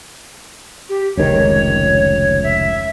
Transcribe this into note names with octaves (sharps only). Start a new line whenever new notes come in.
G4
F1 C#2 D#3 C#5
E5